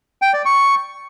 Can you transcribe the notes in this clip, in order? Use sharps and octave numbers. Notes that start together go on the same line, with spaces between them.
G5
D5
C#6